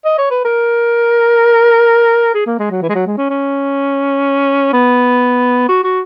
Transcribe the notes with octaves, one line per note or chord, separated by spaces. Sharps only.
D#5
C#5
B4
A#4
G#4
A#3
G#3
F#3
E3
G#3
F#3
G#3
C#4
C#4
B3
F#4
F#4